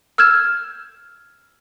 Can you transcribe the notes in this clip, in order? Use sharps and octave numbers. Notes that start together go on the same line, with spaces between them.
E6 F6 G6 G#6 E7